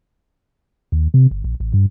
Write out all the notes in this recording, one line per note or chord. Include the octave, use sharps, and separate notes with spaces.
D#2
C3
G1
A#1
A1
G2